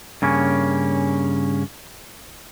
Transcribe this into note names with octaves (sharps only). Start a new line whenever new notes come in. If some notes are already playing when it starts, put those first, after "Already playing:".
G2 C#3 A#3 C#4